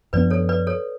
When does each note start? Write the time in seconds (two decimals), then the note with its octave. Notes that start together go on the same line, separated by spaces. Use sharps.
0.13 F#2 F3 B3 D4 B4 D5
0.30 A4 C#5
0.49 B4 D5
0.67 A4 C#5